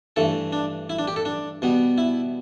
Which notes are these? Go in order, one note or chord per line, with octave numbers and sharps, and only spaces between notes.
G2 E3 A3 A4
D4
E4
D4
G4
A4
D4
B2 G3 B3
E4